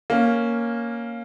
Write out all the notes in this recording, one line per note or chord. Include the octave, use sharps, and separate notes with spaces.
A#3 C#4